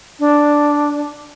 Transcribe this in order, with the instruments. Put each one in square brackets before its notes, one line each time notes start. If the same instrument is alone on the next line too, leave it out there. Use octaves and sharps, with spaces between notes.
[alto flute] D4